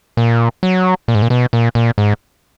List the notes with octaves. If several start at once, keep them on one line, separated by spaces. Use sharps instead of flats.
A#2
F#3
A#2
G#2
A#2
B2
A#2
A#2
G#2